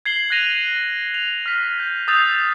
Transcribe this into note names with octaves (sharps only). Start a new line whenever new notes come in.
G#6 C7 F#7 G7
F#6 G#6 A#6 D#7 F7 G7
F7
F6 B6
G6
D#6 E6 G6 A6 C7 F7